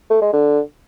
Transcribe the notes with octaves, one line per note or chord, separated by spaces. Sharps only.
A3
G#3
D3